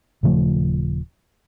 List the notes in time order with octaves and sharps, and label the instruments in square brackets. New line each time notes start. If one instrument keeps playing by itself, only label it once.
[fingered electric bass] D#1 C#3 F3 A3